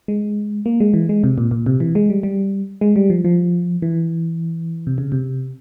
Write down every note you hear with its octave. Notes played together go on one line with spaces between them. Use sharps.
G#3
A#3
G#3
E3
G#3
C3
A#2
A#2
C3
E3
G#3
G3
G3
G#3
G3
F3
F3
E3
C3
C#3
C3